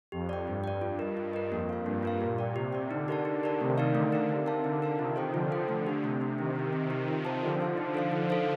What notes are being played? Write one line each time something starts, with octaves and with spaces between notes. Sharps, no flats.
F2 G4
D5 G5
G2 G4
D5 G5
G2 F4
A#4 D#5
F4
A#4 D#5
F2 A#3
F4 A#4 F5
G2 A#3
F4 A#4 F5
A#2 G4
D5 G5
C3 G4
D5 G5
D3 D#4
G4 A#4 D5 A5
D3 D#4
G4 A#4 D5 A5
C3 D#3 A3
D#4 A#4 D5 F5
D3 A3
D#4 A#4 D5 F5
C3 D#4
A#4 F5 A5
D3 D#4
A#4 F5 A5
C3 D#3 F4
A4 C5 G5
D3 F3 F4
A4 C5 G5
D3 A3
D4 G4
C3 A3
D4 G4
C3 D#3 C4
D#4 G4
C4
D#4 G4
F4
C5 F5 A5
D3 F3 F4
C5 F5 A5
D#4
A4 C5 F5
D#4
A4 C5 F5